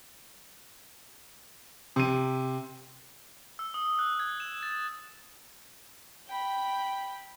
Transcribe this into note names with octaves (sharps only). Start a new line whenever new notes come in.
C3 D#7
E6
D#6
F#6
G#6
E7
A6
G5 B5